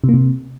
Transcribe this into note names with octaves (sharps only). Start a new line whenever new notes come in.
C3
A#3
C3